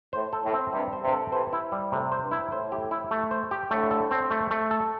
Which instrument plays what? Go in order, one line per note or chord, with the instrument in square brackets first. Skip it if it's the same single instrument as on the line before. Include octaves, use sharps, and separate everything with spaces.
[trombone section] A2 [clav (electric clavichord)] C5
[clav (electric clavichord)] A4
[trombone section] A2
[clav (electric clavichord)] C4
[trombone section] G2 C3 [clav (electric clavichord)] G3
[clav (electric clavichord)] C5
[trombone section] G2 C3
[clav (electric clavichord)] A4
[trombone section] C3 E3 [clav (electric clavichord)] C5
[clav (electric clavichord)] E4
G3
[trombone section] A2 [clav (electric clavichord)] C3
[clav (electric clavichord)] C5
[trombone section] G2
[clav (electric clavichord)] E4
[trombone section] A2 [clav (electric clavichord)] C5
[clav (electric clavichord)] G4
E4
A3
C5
G4
[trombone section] A2 D3 [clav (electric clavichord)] A3
[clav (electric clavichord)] A4
C4
A3
A3
A4